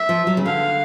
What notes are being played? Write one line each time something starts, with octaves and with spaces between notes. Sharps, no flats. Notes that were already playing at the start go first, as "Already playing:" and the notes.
Already playing: E5
F3
F#3
C#3
D3 F5